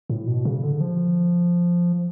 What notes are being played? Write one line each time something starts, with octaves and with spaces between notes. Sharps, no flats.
A2
B2
C#3
D3
F3